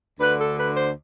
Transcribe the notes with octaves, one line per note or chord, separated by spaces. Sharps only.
D2 D3 B4
A4
B4
C5